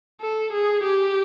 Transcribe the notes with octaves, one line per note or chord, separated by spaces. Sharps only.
A4
G#4
G4